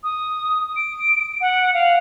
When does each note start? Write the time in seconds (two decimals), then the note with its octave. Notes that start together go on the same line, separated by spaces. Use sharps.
0.04 D#6
0.76 D7
1.41 F#5
1.74 F5